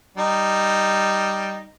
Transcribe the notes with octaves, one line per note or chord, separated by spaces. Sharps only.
G3 D#4